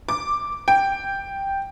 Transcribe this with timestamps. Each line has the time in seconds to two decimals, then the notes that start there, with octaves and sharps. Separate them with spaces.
0.09 D6
0.68 G5